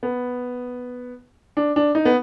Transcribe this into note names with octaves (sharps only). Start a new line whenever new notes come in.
B3
D4
D4
D#4
B3